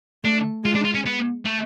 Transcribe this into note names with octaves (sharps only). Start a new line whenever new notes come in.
A3 D4
G#3 F4
D4
F4
C#4
B3
A3